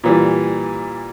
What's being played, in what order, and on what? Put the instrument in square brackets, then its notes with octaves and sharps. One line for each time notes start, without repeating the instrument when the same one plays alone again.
[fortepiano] A#2 E3 G3